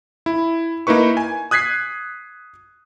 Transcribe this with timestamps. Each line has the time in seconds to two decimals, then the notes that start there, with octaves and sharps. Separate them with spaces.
0.26 E4
0.87 A#3 D#4 E4 B4 C#6
1.17 G#5
1.51 D#6 F#6 G#6 B6 C7